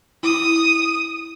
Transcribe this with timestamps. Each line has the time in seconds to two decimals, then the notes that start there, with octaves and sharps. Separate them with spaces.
0.23 E4 D#6